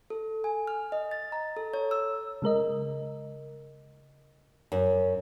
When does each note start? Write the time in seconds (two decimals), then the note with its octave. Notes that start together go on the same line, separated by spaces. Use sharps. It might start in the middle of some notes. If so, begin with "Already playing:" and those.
0.10 A4
0.44 G#5
0.67 F6
0.92 D#5
1.11 A6
1.32 A#5
1.57 A4
1.74 C#5
1.91 E6
2.42 C#3 G#3 A#4 D#5
4.72 F#2